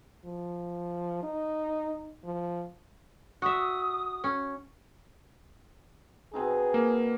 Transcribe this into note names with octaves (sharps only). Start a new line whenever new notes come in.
F3
D#4
F3
F#4 E5 D#6
C#4
B2 C4 D#4 G#4
A#3